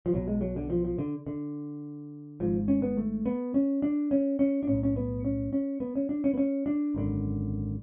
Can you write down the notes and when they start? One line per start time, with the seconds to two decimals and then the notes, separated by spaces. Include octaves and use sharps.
0.06 F3
0.13 B1 B2 F#3
0.28 G#3
0.41 F#3
0.56 D3
0.70 F3
0.85 F3
0.99 D3
1.27 D3
2.40 G#1 G#2 F3
2.68 C#4
2.82 B3
2.97 A3
3.26 B3
3.54 C#4
3.82 D4
4.11 C#4
4.39 C#4
4.63 D4
4.67 B1 A2 C#4
4.83 C#4
4.96 B3
5.25 C#4
5.53 C#4
5.80 B3
5.96 C#4
6.09 D4
6.24 C#4
6.34 B3
6.38 C#4
6.66 D4
6.95 G#1 F#2 D3